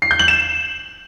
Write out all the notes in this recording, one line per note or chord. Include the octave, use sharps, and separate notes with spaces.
C7
G6
F#7
E7